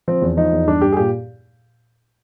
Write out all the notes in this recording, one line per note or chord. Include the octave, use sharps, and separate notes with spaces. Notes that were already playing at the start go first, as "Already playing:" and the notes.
F3 C4
E2
F3 D#4
E2
G2 D4
G2 G4
G#4
A#2 G4